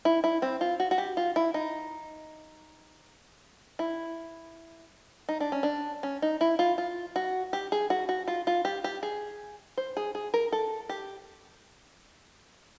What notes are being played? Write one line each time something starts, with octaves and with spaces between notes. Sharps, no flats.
E4
E4
C4
F4
F#4
F#4
G4
F4
E4
D#4
E4
D#4
D4
C#4
D4
C#4
D#4
E4
F4
F4
F#4
G4
G#4
F#4
F#4
F4
F4
G4
G4
G#4
C5
G#4
G#4
A#4
A4
G4